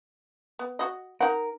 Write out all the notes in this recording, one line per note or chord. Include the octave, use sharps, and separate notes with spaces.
B3
F#4 D#5
D#4 A#4 F#5